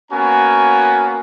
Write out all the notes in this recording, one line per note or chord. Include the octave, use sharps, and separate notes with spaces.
A#3 B3 C#4 F#4 G#5 A#5